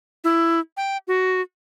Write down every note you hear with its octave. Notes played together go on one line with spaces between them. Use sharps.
E4
G5
F#4